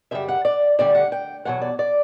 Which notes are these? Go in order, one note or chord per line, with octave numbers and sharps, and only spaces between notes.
F#2 C#3 G3 E5
F#5
D5
D2 D3 G3 D5
F#5
G5
E2 B2 F#3 F#5
D5
D5